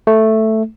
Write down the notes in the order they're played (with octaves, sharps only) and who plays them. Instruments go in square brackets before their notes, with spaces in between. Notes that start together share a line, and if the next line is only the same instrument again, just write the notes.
[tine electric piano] A3